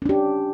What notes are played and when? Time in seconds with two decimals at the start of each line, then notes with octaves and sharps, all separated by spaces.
0.02 C#4
0.06 D4
0.09 G4